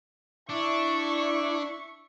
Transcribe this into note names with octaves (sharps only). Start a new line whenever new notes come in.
D4 E4 E5 C#6